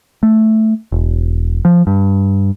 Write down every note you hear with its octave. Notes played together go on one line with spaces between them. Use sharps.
A3
E1
F3
G2